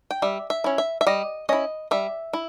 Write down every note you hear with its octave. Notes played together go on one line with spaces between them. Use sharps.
G5
G3 E5
E5
C#4 E4
E5
E5
G3 D#5
C#4 E4 D#5
G3 E5
E4